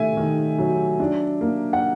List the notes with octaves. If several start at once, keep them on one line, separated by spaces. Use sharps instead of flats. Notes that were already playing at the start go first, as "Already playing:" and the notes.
Already playing: D#3 A3 E5 G#5
D#3
F#3
D4
A#3
F#5